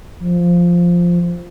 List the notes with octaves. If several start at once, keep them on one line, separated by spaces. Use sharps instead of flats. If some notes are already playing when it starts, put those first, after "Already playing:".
F3